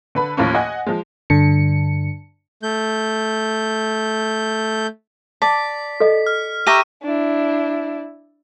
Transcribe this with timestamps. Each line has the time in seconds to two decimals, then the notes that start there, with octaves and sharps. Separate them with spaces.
0.15 D3 B4 B5
0.37 D#2 A2 F3 A#3 C#4
0.54 D#5 F#5 G#5
0.87 F3 G#3
1.30 G2 D3 C#7
2.63 A3 G6
5.42 D5 A5 B6
6.00 A4 D#5
6.27 F6
6.67 G4 E5 A#5 C#6 E6 D#7
7.03 D4 E4